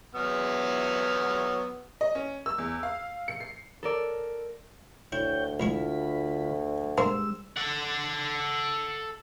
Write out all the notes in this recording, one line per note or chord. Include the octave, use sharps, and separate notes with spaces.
F#3 B3 F6
D#5
C#4
E6
E2
F5
C#7
C7
A4 A#4 D5
D2 E4 C#5 G5 G6
A1 D3 G#3 E4 F4 B5
G2 G3 G#3 A#3 C5 E6
A4 F#5